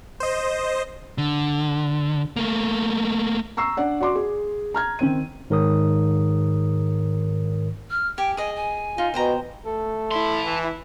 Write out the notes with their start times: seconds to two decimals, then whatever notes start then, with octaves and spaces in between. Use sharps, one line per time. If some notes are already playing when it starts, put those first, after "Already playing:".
0.20 C5 D#5
1.18 D3
2.36 A3 A#3
3.57 A#5 C#6 E6 C7
3.77 D4 D5 F#5
4.00 F#4 D5 C6 D6
4.16 G#4
4.74 A#5 F6 G#6
4.99 D#3 C4 D#7
5.50 G#2 D#3 A#4 C#5 D#6
7.91 F6
8.18 G4 G5 G#5
8.37 G#4 D#5 G#5
8.56 G#5
8.98 D#4 F4
9.14 B2 C5 G5 A#5
9.66 A3 A4
10.11 E4 A5 C6
10.43 E3